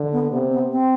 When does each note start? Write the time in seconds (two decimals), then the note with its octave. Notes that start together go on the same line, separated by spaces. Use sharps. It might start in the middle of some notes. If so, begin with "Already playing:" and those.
Already playing: D3
0.12 B3
0.31 C3 B3
0.52 B3
0.71 C4